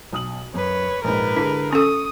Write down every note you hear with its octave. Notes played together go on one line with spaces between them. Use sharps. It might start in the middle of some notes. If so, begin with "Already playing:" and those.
B1 D#6 F#7
F#2 B4 C#5
A#1 G#2 A#4 B4
D3 G#3 E4
C#4 A4 C#6 D#6